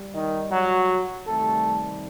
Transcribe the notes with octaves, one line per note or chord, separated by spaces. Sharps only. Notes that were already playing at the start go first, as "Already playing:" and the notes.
Already playing: G3
D#3 D#4
F#3 F#4
C3 D#3 G3 A3 A4